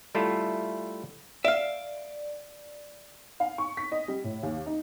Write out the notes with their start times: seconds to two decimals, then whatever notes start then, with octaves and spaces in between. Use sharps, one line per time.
0.15 G3 A3 E4 F4 A4
1.45 D5 E5 F5
3.40 F5
3.58 C#6
3.77 B6
3.92 D#5
4.08 G3
4.24 A2
4.43 D#2
4.66 D#4